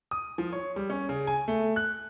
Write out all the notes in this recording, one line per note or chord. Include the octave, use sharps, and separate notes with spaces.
D#6
F3
C#5
G3
C#4
C#3
G#5
A3
F#6